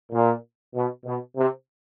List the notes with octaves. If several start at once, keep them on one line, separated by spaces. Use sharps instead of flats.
A#2
B2
B2
C3